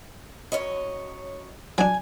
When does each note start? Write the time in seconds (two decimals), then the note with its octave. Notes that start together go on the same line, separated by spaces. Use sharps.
0.52 F#2 C#5 D#5
1.78 F#3 D4 G#5